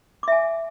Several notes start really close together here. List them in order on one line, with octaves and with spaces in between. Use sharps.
D6 E5 G#5